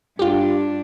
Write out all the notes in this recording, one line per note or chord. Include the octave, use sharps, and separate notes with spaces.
G2 D4 F4 G4